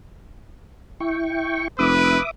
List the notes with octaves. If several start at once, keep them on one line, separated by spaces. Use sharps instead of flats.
E4 G5 C#6
F1 B4 E5 D6 D#6